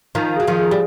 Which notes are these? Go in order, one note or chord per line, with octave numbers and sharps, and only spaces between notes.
D#3 F3 F5
F#3 G#4
D#3 F3
G#4
G3